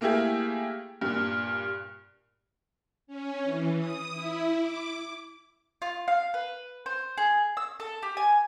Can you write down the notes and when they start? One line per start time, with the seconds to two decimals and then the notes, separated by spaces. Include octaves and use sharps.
0.01 A3 A#3 E4 G4 G#4
1.01 G2 A#2
3.07 C#4
3.44 E3
3.78 D#6
4.12 E4
4.58 D6
5.82 F4
6.08 F5
6.34 B4
6.86 C5
7.17 G#4
7.57 E6
7.80 A4
8.02 G4
8.17 G#5